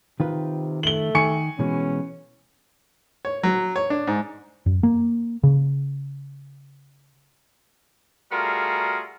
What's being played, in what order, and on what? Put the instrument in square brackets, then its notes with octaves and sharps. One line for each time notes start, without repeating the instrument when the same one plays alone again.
[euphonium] C3 [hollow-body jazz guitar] D#3 F4 B4
[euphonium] A3 [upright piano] F#7 G7
[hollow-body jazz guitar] D#3 [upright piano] G#5 C#6 C#7
[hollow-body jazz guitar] B2 E3 G#3 [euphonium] C#4
[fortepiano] C#5
F#3
C#5
D4
G#2
[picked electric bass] F#2
A#3
C#3
[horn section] G3 A3 F4 F#4 G#4 A#4